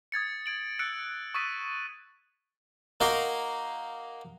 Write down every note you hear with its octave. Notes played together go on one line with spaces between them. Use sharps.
D#6 G#6 A6 C#7
G#6 D7 F#7
E6 F#6 A6 C#7 D7
C#6 D#6 E6 A6 B6 D#7
A#3 D#4 F#4 A#4 C6